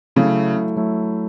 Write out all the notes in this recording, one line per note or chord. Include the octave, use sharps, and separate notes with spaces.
C#3 F#3 A3 E4
F#3 A3 E4